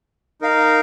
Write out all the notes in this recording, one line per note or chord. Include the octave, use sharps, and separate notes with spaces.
D#4 A#4 F5